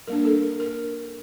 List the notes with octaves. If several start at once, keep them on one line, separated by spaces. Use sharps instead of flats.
G3 A#3 D4 A#4
A4
A#4
A#4